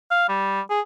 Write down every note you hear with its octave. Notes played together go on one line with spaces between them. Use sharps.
F5
G3
G#4